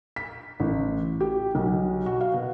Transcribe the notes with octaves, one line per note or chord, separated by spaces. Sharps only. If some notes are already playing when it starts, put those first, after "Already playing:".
B6
A1
G4
B1
F#4
F5
B2